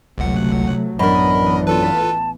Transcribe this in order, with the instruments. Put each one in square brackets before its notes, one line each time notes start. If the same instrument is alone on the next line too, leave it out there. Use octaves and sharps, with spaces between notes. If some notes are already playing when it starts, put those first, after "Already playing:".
[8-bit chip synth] G1 C#2 F#5 [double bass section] C3 F#3 A3
[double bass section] A1 E3 B3 [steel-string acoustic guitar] F#2 D4 [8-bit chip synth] A#4 D#5 [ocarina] B5
[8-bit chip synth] F4 A4 B4 [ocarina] A5